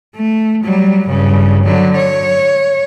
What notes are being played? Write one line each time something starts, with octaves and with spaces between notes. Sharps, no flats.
A3
F#3 G3
G2 C#3
D3 F#3
C#5